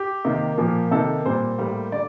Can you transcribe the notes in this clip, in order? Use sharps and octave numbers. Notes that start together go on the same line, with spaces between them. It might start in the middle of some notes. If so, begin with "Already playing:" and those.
Already playing: G4
C3 D#3 A#3
A#2 F3 A#3
C3 D#3 A#3 A4
A#2 G3 C4 C5
A2 G3 A#3
D3 D5